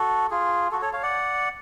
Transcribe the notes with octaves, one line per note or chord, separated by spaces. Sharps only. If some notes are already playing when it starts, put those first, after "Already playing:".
Already playing: F#4 A4
F4 G#4
F#4 A4
A4 C#5
C#5 F5
D5 F#5